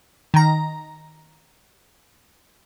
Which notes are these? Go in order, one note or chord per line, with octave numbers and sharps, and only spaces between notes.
D#3 A#5